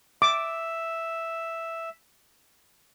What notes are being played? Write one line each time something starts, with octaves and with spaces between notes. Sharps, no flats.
E5 D6